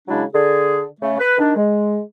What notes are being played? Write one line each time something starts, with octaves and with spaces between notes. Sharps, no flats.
C#3 F#3 G#3 D4 E4
D3 G#4
C#3 A3
B4
D#3 D4
G#3